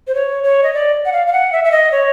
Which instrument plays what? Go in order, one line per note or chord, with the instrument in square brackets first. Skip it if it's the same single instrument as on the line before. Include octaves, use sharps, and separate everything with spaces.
[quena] C5
C#5
C#5
D#5
D5
F#5
F5
F5
F#5
E5
E5
D#5
C#5